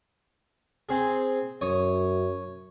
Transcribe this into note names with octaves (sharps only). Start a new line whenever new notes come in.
C4 G#4
F#2 C#5 D#6